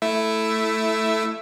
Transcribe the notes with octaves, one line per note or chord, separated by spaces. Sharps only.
A3 E4 E5